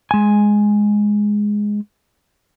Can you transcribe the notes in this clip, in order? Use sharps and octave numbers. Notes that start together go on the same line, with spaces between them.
G#3 G#5